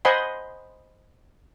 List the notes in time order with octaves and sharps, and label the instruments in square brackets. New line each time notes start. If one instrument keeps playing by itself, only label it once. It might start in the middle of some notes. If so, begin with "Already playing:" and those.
[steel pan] C5 D#5 F#5 G#5 B5 C6